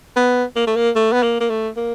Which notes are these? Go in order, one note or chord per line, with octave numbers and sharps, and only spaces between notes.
B3
A#3
A3
A#3
A3
B3
A#3
A#3
A3
A#3